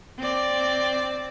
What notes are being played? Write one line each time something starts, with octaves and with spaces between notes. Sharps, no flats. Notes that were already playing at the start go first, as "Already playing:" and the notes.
C4 D5